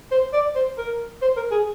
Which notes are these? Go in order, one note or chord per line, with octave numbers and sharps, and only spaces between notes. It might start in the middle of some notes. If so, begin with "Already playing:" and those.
C5
D5
C5
A#4
C5
A#4
G#4